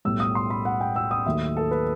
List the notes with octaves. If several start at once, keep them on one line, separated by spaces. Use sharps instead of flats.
B1 A2 G3 E6
D#6
C6
B5
F#5
G5
E6
D#6
D#2 D#3 F#3 A3 E5
A4
B4